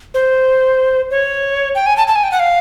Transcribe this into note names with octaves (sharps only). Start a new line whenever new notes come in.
C5
C#5
G5
G#5
A5
A5
G#5
G5
F#5
F5